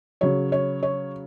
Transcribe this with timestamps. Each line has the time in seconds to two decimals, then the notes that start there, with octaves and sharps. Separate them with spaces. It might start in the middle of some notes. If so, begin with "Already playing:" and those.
0.21 C#3 F#3 C#5
0.52 C#5
0.83 C#5